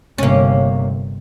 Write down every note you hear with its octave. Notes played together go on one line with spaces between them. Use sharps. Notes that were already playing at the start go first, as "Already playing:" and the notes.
G1 C3 A#3 C#4